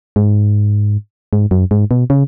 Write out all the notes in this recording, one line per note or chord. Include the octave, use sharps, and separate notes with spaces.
G#2
G#2
F#2
G#2
B2
C#3